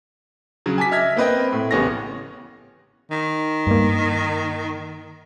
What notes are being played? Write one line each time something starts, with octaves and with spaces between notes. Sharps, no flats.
C#3 F#3
G#5 A5 D6 B6
D#5 E5 F6 G#6 B6
A#3 C4 B4 D#5 G5
A2
A1 C#3 B3 C#4 G4 A#6
D#3
G2 A#3